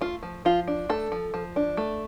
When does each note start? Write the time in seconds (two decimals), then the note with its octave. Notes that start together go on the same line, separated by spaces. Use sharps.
0.01 A3 F4
0.23 F3
0.45 F3 F4
0.68 D4
0.89 A3 A4
1.12 F3
1.34 F3
1.56 D4
1.77 A3